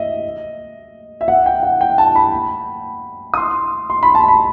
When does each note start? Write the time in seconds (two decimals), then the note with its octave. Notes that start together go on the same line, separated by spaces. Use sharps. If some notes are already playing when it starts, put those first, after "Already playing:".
Already playing: D#5 E5
1.21 E5
1.28 F#5
1.46 G5
1.63 F#5
1.81 G5
1.98 A5
2.16 B5
3.34 D#6
3.37 C6
3.90 C6
4.03 B5
4.15 A5
4.28 B5